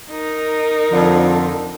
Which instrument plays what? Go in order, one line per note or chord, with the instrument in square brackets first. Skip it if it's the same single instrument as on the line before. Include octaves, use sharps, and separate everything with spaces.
[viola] D#4 A#4
[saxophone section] F2 D3 F3